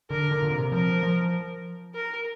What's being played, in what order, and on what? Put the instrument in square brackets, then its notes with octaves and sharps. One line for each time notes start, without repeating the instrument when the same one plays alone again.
[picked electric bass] D3 [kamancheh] A#4
[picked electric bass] D3
A#2
C3
[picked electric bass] F3 [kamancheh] A#4
[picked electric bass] F3
[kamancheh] A#4